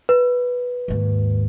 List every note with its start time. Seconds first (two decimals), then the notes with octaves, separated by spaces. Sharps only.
0.09 B4
0.88 D#2 G#2